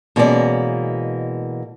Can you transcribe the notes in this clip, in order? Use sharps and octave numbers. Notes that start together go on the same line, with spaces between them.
B2 E3 G#3 A#3 C#4 D5